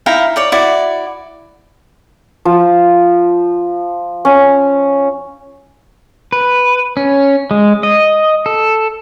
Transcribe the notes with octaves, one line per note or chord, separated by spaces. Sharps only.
D#4 E4 F5 G5
C#5 D5 G5
E4 F#4 D5
F3
C#4
B4
C#4
G#3
D#5
A4